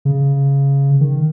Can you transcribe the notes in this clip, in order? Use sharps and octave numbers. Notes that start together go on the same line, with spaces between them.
C#3
D#3